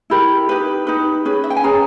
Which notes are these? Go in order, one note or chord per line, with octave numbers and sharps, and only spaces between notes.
E4 G4 A#4 B5
D#4 G4 B4
D#4 G4 B4
C#4 G#4 B4
E5
G5
G#5
C#4 G#4 B4 A#5